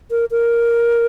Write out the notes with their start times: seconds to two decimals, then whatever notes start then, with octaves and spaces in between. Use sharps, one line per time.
0.11 A#4
0.31 A#4